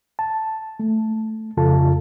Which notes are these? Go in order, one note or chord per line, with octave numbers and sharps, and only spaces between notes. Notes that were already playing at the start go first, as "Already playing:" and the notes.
A5
A3
F2 C#3 F4 A4 A5